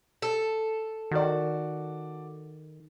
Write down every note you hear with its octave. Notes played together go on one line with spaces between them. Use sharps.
A4
D#3 F#4 D5